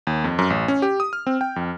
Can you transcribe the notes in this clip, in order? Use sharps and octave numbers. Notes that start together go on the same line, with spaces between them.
D#2
F2
F#2
A1
C#4
G4
D#6
F6
C4
G5
F2